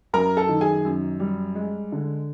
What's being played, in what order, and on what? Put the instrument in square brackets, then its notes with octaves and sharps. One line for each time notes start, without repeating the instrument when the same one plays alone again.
[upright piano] F#2 A#4 A#5
A4 A5
D#3
G#4 G#5
F#2
G3
G#3
D3